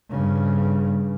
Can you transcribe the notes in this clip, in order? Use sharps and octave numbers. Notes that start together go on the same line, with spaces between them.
G2 C#3